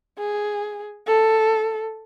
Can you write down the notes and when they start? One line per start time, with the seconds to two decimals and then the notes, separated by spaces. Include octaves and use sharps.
0.19 G#4
1.07 A4